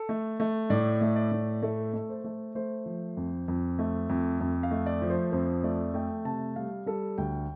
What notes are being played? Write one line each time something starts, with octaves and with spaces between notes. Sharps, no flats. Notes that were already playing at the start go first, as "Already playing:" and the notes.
Already playing: A4
A3
A3
A2 D5
A3
D5
A2
A3 A4
A3
C5
A3
A3 C5
F3
F2
F2
A3
F2
F2
F5
A3
D5
F3
C5
F2 C5
A3 D5
A3 G5
C3 A5
G3 F5
G3 A4
D2 G5